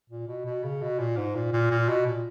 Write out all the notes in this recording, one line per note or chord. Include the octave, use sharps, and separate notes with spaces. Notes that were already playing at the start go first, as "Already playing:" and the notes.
A#2
B2
B2
C#3
B2
A#2
G#2
A#2
A#2
A#2
B2
A#2